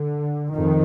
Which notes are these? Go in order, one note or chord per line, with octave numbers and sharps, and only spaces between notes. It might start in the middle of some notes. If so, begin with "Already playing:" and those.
Already playing: D3
F2 D#3